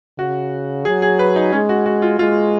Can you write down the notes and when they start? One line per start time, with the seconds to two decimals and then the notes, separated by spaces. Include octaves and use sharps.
0.18 C#3 F#4
0.85 F#3 G#4
1.02 G#4
1.19 B4
1.36 D#4
1.52 G#3 C#4
1.69 F#4
1.86 F#4
2.02 F4
2.19 G#3 F4